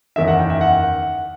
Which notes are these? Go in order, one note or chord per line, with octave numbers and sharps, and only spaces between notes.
F#1 E2 D#3 E5
F#5
G5
E5
F#5